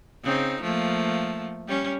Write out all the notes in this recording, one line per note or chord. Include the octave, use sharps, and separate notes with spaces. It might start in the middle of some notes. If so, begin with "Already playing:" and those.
C#3 C4 D#4
F3 A3 A#3
G3 C#4